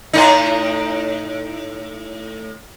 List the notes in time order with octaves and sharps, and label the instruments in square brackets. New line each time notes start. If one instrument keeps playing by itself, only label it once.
[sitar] A2 D#4